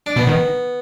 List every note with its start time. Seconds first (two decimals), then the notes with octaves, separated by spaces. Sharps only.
0.06 D4
0.16 B2 B3
0.27 D#3